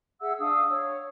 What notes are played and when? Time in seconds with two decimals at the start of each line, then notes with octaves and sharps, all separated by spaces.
0.21 G#4 E5 F#5 E6
0.39 D4 F5 D#6 E6
0.70 C#5